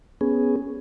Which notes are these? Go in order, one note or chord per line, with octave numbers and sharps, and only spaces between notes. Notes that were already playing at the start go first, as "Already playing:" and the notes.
B3 C#4 G#4